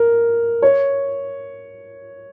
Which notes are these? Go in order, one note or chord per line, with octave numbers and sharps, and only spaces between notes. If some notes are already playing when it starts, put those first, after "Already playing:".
Already playing: A#4
C#5